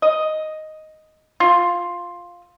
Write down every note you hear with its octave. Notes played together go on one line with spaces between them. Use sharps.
D#5
F4